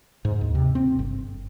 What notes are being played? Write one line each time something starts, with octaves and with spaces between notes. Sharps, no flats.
G#2
D#2
C3
C4
G1